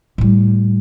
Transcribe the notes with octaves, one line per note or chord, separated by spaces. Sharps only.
A2 G3